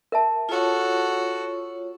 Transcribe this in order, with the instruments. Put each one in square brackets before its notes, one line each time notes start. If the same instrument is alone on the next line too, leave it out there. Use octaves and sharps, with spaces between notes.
[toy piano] A#4 E5 A5
[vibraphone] F4 C#5 [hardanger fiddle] F#4 A4